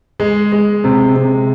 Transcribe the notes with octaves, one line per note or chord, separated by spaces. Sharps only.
G#3
G#3
C3
C3